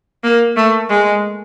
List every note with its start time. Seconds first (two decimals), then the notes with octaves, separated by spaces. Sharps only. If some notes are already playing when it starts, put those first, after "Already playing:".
0.24 A#3
0.57 A3
0.90 G#3